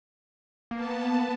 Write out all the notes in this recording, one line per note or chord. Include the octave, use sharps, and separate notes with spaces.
A#3 B3 A5